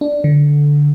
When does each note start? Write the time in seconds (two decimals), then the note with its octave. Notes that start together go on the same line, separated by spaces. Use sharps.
0.01 D4
0.24 D3